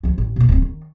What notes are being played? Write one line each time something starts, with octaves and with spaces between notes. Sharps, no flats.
D2 F3
A1
B2 A#3
D1 C4
D#3